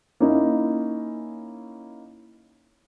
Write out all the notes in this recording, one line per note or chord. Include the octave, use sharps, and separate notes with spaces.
A#3 C#4 D#4 E4